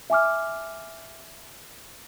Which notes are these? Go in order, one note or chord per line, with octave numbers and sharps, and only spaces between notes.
E5 G#5 D6 F6